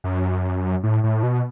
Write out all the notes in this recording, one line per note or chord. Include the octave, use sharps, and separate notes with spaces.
F#2
A2
A2
B2